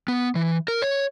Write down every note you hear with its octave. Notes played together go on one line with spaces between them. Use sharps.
B3
E3
A#4
C#5